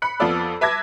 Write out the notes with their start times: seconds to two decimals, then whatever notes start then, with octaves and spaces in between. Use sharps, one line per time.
0.02 B5 F#6 C#7
0.20 F2 B3 F4 A4 D5 E6
0.61 B4 E5 A5 D6 G#6 A#6